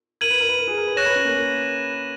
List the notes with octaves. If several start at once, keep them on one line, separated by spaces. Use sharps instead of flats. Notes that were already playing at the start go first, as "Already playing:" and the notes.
A#4 G#6 D#7 F#7
B4
A#4
B4
A#4
G#4
A#4
B4
C#5 F#6 A#6 E7
B4
C#4
A#3
A#3